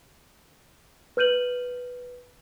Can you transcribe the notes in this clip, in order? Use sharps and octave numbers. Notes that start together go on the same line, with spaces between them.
B4 F6 G6 D#7 F#7